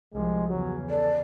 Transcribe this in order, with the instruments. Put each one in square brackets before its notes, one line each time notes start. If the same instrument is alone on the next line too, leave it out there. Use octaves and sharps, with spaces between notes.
[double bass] C2 F3 [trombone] G#3
[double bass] E2 C#3 [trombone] F#3
[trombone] A4 [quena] D5